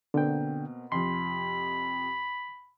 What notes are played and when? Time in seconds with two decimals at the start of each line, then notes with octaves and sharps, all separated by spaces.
0.14 B2 D3 A#3 C4 G5
0.92 F2 C3 F3 B5 C6